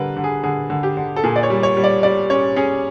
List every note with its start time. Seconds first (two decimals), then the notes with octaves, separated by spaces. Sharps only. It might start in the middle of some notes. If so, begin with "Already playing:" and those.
Already playing: D3 G3 A#4 B4
0.17 D3
0.24 G#4
0.44 D3 G#4
0.70 D3
0.83 G4
0.97 D3
1.16 A4
1.24 A#2 G#4
1.36 D5
1.43 C#5
1.50 G3
1.63 C#5
1.77 G3
1.84 D5
2.03 G3 D5
2.30 C#4 C#5
2.56 C#4 G#4